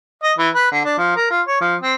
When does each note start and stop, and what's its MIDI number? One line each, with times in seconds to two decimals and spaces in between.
0.23 0.33 75
0.38 0.49 52
0.55 0.71 71
0.71 0.84 50
0.85 0.95 62
0.98 1.16 53
1.16 1.28 70
1.30 1.41 65
1.47 1.58 73
1.61 1.76 53
1.81 1.95 60